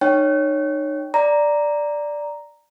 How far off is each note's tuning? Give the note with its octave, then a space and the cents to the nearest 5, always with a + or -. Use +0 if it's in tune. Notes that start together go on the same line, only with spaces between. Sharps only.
D#4 -30 C#5 +0 G5 +0
D5 +0 A#5 +0